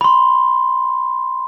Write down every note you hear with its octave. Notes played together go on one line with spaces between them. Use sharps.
B5 C6